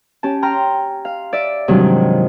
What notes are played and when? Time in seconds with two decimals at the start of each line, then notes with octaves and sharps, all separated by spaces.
0.23 C#4 G4 A5
0.42 G5 A#5 C6 F6
1.05 F5
1.33 D5 E5
1.68 G2 C3 D#3 F3 F#3 G#3